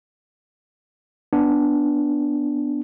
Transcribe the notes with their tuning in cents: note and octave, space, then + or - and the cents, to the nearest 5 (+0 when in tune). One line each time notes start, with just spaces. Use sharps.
B3 +0 D4 +0